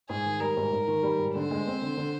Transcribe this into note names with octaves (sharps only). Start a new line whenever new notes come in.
G#2 G#4
D#3
G3 A#4
G#2
G#2
D#3
G3
G#2
D3 C5
G#3
C4
D3
D3